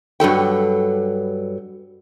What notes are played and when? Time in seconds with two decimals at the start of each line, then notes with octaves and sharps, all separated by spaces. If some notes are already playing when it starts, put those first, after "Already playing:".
0.20 G2 F#3 A4 G5